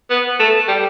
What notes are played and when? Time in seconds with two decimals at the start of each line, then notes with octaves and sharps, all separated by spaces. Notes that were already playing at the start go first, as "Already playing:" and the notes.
0.10 B3
0.39 A3
0.68 G3